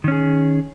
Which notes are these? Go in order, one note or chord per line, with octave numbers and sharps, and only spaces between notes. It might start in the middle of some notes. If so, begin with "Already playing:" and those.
D#3 C#4 G#4